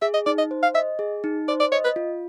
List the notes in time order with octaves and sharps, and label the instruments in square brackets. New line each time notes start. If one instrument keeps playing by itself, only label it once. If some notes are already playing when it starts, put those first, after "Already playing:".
[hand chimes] G#4 [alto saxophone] E5
[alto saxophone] D#5
[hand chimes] D#4 [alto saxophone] D5
[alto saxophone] D#5
[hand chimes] C5
[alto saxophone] F5
[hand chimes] D#5 [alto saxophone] E5
[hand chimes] G#4
D#4
[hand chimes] C5 [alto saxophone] D5
[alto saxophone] D5
[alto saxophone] C#5 [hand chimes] D#5
[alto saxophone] B4
[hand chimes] F4